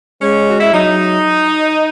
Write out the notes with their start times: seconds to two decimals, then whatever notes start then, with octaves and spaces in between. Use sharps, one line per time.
0.22 G#3 C#4
0.47 F#4
0.60 E4
0.73 F#3 D#4